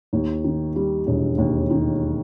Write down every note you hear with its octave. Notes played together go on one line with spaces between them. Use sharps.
D#2
D#3
G3
E1
D#2
D#3